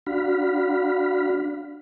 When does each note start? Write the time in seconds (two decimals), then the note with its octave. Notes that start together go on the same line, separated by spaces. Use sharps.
0.07 D4 F#4 F5 B5